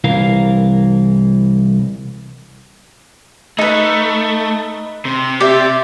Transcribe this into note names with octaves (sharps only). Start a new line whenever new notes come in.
C2 E3 A#4 F5
A3 D#4 B4
C3
G4 D5 E5